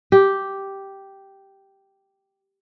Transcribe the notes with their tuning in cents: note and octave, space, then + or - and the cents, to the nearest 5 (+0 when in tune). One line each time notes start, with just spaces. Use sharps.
G4 -5